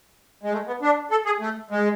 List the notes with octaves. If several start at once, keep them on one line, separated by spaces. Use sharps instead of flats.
G#3
A3
B3
D4
A4
G#4
A3
G#3